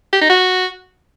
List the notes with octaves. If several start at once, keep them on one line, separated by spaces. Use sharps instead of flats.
G4
D#4
F#4